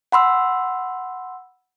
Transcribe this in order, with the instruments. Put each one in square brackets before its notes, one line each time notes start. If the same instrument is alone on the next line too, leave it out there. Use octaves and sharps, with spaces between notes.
[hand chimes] F#5 B5 C6 E6